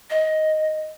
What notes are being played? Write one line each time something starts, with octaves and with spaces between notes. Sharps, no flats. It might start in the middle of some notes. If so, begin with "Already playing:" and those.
D#5